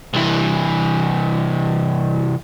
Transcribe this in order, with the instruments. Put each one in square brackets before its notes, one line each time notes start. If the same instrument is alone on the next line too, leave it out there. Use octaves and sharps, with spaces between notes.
[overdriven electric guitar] C2 E3